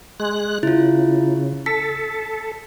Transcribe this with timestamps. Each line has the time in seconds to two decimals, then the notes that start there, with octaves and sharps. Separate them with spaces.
0.20 G#3 F#6
0.63 C#3 E4 F4
1.66 A4 B6